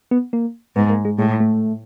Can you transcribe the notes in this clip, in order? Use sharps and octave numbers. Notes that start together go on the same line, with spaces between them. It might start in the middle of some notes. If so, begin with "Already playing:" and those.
B3
A#3
G#2 B3
A#3
G#3
A2 G#3
A3